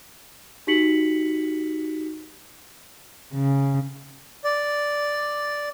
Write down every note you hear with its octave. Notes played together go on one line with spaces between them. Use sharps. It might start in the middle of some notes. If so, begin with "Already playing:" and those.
D#4 F#4 G4 B6 C#7 F#7
C#3
D5